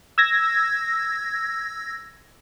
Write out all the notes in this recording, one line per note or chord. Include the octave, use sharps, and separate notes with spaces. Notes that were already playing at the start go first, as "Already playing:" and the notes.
E6 G#6 A#6